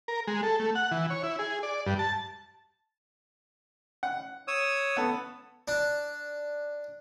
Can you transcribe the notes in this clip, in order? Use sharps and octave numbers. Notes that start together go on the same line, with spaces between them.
A#4
G#3
A4
A3
F#5
E3
C#5
E4
G#4
D5
G2
A5
F#5
C#5 D#6 E6
B3 A4
D4